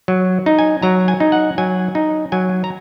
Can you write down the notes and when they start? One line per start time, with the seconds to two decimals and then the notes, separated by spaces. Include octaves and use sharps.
0.08 F#3
0.46 D#4
0.59 G#5
0.82 F#3 A#5
1.08 G#5
1.20 D#4
1.32 F#5
1.58 F#3 G#5
1.95 D#4
2.32 F#3 G#5
2.64 A#5